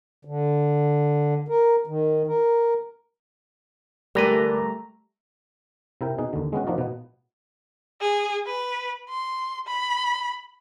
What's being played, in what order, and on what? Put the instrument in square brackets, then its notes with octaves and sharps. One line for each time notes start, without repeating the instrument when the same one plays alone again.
[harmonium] D3
A#4
D#3
A#4
[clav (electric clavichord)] D3 E3 B4 [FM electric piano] G3 A#5 [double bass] A3 [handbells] A#4 D5
[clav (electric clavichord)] C3 E4 A#4 G5
B2 D#4 G#4
D#2 D3
G#3 B3 C#4 F#4
F3 A#3 D4 D#4 F#4 D5
B2 B3
[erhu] G#4
B4
C6
B5